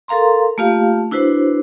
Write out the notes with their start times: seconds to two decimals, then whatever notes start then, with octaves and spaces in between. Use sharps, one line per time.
0.08 A4 A#4 F5 A#5 C6
0.58 A3 A#3 F4 G4 F5
1.11 D4 E4 F#4 B4 C5